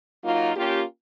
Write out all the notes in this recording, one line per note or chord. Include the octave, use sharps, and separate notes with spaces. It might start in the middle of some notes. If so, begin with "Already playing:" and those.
F#3 A#3 D#4 F4
A#3 C#4 F4 G4